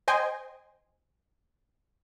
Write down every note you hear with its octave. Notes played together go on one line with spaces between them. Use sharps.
C5 D#5 G5 G#5 C6